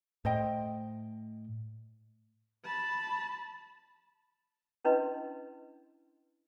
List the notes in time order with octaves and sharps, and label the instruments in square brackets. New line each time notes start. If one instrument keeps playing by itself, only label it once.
[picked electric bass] A2 [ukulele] C5 D#5 G5
[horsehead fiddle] A5 B5
[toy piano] C#4 D4 E4 B4 D#5 C6